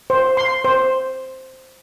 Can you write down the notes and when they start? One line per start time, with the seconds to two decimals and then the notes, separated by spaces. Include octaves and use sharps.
0.10 C5
0.37 C6
0.65 C5